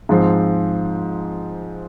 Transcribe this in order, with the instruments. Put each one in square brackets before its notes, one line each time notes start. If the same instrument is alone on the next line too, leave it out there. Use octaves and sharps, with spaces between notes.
[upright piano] G#2 F3 C4